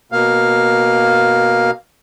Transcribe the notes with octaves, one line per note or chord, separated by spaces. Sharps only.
B2 A#3 F5